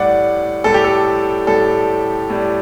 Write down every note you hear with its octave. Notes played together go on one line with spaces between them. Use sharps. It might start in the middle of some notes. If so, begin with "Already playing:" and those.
Already playing: A2 G3 D5 F#5
A2 G3 A4
G4
A4
A2 G3 A4
A2 G3